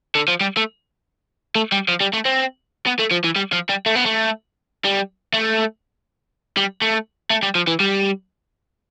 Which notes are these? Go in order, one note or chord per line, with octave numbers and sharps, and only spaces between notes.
D3
F3
G3
A3
A3
G3
F3
G3
A3
C4
B3
A3
F3
E3
G3
F3
G3
A3
B3
A3
G3
A3
G3
A3
A3
G3
F3
E3
G3